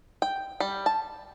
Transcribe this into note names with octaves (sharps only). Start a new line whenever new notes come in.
G5
G3
A5